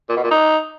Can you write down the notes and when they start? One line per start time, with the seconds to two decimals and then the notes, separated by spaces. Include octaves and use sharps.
0.09 A#2
0.17 B2
0.24 A#2
0.31 D#4